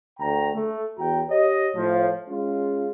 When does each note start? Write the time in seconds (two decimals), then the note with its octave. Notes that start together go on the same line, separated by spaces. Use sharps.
0.19 D2 G5 A#5
0.55 A3
0.98 E2 F#4 G5 A#5
1.29 G4 C#5 D#5
1.76 A2 F3
2.29 G#3 C#4 F4